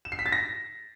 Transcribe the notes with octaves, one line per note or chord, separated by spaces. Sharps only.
E7
C7
B6
A6
A#6